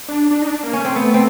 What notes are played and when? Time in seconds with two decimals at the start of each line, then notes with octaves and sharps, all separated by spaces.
0.08 D4
0.31 D4
0.42 D#4
0.47 D4
0.63 A#3
0.73 C#4
0.80 A3 C4
0.96 B3
1.14 C4